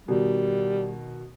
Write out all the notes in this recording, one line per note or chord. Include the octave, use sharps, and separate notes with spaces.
B2 D#3 G3